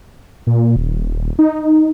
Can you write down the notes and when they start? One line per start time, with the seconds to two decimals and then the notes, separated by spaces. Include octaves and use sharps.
0.47 A#2
0.76 D#1
1.39 D#4